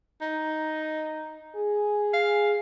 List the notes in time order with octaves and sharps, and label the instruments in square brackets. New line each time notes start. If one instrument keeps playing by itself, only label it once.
[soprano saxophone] D#4
[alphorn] G#4
[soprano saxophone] F5